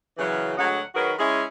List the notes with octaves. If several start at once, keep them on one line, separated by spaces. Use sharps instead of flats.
C#3 E3 F#3
D2 F#3 G#3 D#5 F#5
D#3 F#3 F#4 G#4 A#4 B4
G#3 C#4 E4 G#4